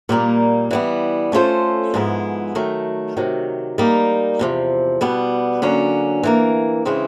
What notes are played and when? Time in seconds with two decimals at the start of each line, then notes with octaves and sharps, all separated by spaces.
0.09 A#2 G3 A#3 D#4
0.71 E3 G3 B3
1.32 A3 C#4 F4 A4 C5
1.94 G#2 F3 G#3 B3 E4
2.55 D#3 F#3 A3
3.16 C3 D#3 F#3
3.78 G3 A#3 D#4
4.39 E2 C3 F3
5.01 B2 G3 B3
5.62 D3 F#3 A#3 C#4
6.23 E3 G3 A#3
6.85 C#3 E3 G#3 C4